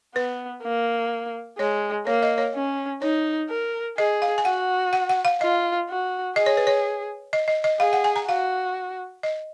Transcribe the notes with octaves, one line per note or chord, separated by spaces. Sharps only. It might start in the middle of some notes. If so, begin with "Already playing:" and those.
B3 B4
A#3
G#3 C#5
A#3 C#5
D#5
C#5
C#4
D#4 C#5
A#4
G#4 D#5
F5
G#5
F#4 F#5
F#5
F#5
F5
F4 D#5
F#4
G#4 D#5
C#5
B4
C#5
D#5
D#5
D#5
G#4 F5
F#5
G#5
A#5
F#4 F5
D#5